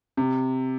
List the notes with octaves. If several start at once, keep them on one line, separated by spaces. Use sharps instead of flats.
C3